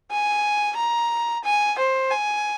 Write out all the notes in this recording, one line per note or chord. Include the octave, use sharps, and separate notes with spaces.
G#5
A#5
G#5
C5
G#5